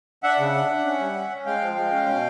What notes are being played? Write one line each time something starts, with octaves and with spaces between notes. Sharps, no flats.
D4 E5 F#5
C#3
D4
D4
C#4
G3
C#4
C#4
G#3 F5 G5
F3
G#3
C#4
B2